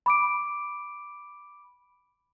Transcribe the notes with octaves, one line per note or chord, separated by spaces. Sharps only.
B5 D6 D7